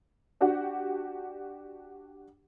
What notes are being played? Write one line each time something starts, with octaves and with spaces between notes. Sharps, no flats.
D4 F#4 G4 F#5